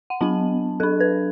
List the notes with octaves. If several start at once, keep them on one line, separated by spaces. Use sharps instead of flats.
F#5
F#3 B3 D4 A5
F#3 D4 A4
B4